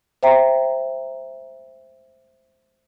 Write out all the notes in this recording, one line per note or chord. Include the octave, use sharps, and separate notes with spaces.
C5 E5 G5 A#5